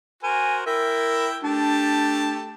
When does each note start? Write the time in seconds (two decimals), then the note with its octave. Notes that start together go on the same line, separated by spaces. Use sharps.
0.23 F#4 A#4 C5 G#5
0.66 E4 A#4 E5 G5
1.43 A3 D4 G4 A5